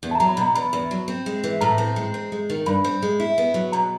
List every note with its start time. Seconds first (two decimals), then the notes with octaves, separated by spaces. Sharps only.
0.03 E2
0.11 A5
0.15 A#5
0.20 F#3
0.28 B5
0.37 B2 A#5
0.55 E2 B5
0.73 E2
0.91 F#3
1.08 C4
1.26 G#3
1.44 E3
1.61 A2 A#5
1.78 C4
1.96 G#3
2.14 C4
2.32 G#3
2.50 D#3
2.66 G2 B5
2.84 C4
3.02 G#3
3.20 E4
3.38 B3
3.54 F#3
3.72 B2 A#5